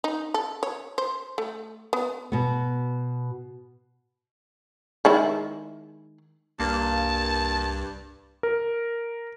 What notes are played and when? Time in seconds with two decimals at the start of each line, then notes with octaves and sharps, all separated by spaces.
0.04 D#4
0.34 A4
0.63 C#5
0.98 C5
1.38 A3
1.93 B3
2.32 B2 B3
5.05 D#3 G#3 E4
6.60 C2 G2 A#3 A5
8.43 A#4